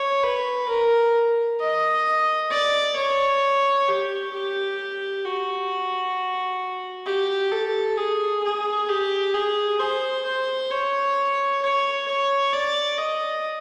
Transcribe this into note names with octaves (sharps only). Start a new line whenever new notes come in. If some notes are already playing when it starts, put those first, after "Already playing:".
Already playing: C#5
B4
A#4
D#5
D5
C#5
G4
G4
F#4
G4
A4
G#4
G#4
G4
G#4
C5
C5
C#5
C#5
C#5
D5
D#5